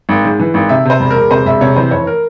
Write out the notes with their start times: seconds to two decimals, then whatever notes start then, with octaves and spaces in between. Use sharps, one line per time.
0.09 G#1
0.24 G#2
0.39 E3
0.54 G#1
0.69 C3 E5
0.85 C3 C5
1.00 E1
1.10 E1 A#4
1.30 C3 C5
1.46 E1 E5
1.61 C3 C#5
1.76 E3 C5
1.91 F1 C#5
2.07 A#4